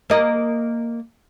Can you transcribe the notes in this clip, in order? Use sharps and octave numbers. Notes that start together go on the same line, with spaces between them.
A#3 D#5